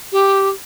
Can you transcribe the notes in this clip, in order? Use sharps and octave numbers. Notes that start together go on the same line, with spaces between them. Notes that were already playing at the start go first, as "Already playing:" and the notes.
G4